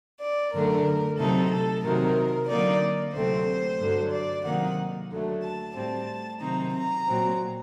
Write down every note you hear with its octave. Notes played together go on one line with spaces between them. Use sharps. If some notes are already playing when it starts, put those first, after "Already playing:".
D5
F#2 D3 A3 D4 A#4
C3 F#3 A3 D#4 A4
A4
C3 D#3 F#3 A#4
D3 F#3 A#3 D#4 D5
D2 C3 F#3 A3 C4 C5
G2 D3 F#3
D5
C3 D#3 F#3 A#3 D#4 F#5
D2 D3 F#3 A3
A5
A2 G3 C4 A5
C3 D#3 F#3 C4 D#4 A#5
A#5
A#2 F#3 C4